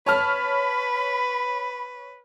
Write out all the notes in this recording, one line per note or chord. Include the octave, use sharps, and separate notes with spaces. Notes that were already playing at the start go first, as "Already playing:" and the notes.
B4 C#5 A5 B5 F6